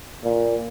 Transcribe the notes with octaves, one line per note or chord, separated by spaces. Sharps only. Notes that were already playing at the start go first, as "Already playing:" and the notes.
A#2